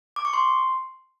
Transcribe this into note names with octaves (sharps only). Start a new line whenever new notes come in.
D6
C#6
C6